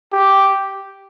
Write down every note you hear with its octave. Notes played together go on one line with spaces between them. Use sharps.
G4